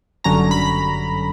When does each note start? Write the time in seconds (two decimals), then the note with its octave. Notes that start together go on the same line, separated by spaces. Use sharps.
0.24 G1 F#2 D3 F#3 C#4 A#5
0.51 B5